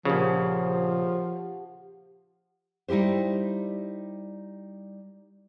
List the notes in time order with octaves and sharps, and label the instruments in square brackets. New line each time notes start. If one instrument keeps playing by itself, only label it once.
[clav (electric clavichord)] A#1 C#3 [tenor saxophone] F3 [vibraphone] G4 F#5
[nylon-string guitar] G3 D#4 E4 G4 C5